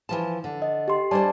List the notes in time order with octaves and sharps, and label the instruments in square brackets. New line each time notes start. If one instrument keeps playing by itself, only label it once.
[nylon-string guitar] E3 F3 A5
D3
[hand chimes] D#5
G4 C6
[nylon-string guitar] G3 D4 C5 [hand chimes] D5 G#5 A5